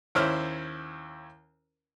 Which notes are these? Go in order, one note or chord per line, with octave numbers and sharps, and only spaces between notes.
D#2 C#4 E4 C5 F6